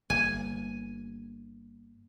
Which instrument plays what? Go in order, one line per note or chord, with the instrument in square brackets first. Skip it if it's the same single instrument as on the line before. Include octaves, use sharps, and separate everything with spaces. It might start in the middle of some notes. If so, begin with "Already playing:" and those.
[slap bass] G1 A#3 [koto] G#5